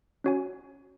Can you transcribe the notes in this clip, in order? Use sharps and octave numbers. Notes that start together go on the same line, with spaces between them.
C#4 F#4 C#5 G#5